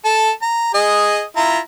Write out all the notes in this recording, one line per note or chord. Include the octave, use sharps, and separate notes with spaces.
A4 A5
A#5
G#4 D#5
E4 F4 A#5